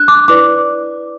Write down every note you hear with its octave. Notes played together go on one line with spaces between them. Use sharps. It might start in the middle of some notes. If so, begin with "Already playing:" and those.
Already playing: D4 F#6
D6
E4 B4 D5 D6